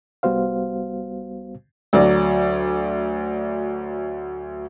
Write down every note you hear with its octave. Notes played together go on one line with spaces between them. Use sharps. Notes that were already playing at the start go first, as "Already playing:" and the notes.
C2 G3 B3 F#4 C5 F5
D2 F#3 D5